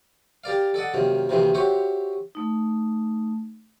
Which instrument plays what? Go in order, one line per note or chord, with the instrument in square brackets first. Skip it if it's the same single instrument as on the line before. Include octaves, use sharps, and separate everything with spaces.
[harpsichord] G4 A#4 D5 F5
A4 D5 D#5 F#5
F#2 C3 D#3 A#3
D2 C3 D#3 E3 A#3 C6
F#4 G4 C5 C#5 E5
[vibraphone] A3 D#4